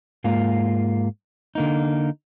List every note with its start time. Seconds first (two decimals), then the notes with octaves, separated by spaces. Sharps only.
0.24 G#2 A#3 F4
1.55 D3 A#3 D#4